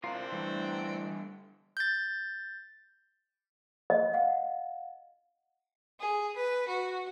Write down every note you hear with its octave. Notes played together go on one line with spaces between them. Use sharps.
C3 C4 D4 F4 A#4
G2 D3 E3 A3
G6 A6
D#5
F5 F#5
G#4
B4
F#4